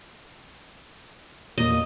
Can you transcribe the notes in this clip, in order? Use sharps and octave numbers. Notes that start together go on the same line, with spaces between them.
E2 A#2 A#3 D#5